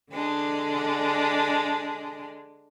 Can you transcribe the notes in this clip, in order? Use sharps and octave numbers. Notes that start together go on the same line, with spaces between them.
D3 G#3 D4